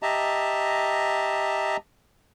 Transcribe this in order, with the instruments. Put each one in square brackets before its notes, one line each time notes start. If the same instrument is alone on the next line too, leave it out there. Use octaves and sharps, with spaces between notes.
[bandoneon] G4 D#5 E5 A5 A#5